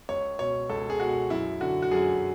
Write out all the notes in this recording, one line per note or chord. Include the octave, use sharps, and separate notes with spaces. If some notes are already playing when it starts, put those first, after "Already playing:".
C#2 C#5
B2 C#5
C#2 A4
G#4
B2 F#4
F#2 E4
D3 F#4
F#4
F#2 G#4